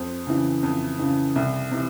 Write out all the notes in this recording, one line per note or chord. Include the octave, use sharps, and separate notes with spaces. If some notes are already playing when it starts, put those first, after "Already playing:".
Already playing: F2 C5
C#3 E3
F2
C#3 E3
C2
C3 E3